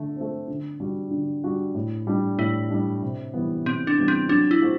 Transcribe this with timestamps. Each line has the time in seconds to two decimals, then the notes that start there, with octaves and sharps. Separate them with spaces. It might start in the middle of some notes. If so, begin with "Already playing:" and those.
Already playing: D3 A3
0.16 A3 C4
0.48 D3
0.80 G3 D4 F#4
1.11 D3
1.44 G3 D4 F#4
1.75 A2
2.07 G3 D4
2.39 A2 E4
2.70 G3 D4
3.02 C3
3.34 E3 G3 B3
3.66 C3 C4
3.87 D4
3.98 E3 G3 B3
4.08 C4
4.29 F#3 D4
4.51 E4
4.62 A3 C4 F#4